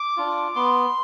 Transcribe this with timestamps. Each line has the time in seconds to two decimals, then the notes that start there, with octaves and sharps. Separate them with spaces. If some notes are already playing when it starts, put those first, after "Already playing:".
Already playing: D6
0.17 D4 F4
0.55 B3 C6